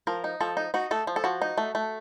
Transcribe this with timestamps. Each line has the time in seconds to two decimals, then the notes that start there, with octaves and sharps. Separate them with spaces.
0.07 F3 A#4
0.24 D#4
0.41 F3 A4
0.57 D#4
0.74 D#4 F#4
0.91 A3 A4
1.07 F3
1.16 A4
1.24 F3 F#4
1.42 D#4
1.58 A3
1.75 A3